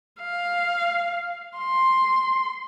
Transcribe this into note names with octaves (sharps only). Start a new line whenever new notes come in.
F5
C6